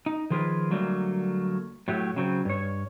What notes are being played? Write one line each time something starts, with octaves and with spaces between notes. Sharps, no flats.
D#4
D#3 F3 F4 G#4 A#4 B4
D3 F#3 G3 A3 A#3
A2 F#3 A3 G4
C#3 F#3 C4
G2 C#5